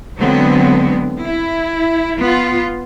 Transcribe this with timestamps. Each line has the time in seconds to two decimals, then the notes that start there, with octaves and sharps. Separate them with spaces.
0.19 D3 F#3 G#3 B3 C4
1.24 E4
2.19 B3 F4